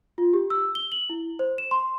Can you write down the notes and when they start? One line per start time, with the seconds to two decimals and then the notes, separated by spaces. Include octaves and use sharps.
0.18 F4
0.33 G4
0.50 E6
0.75 G7
0.92 F#7
1.10 E4
1.39 C5
1.58 E7
1.71 C6